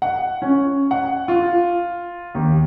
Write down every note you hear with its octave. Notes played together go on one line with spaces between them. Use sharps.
F#5
C#4
F#5
F4
D#2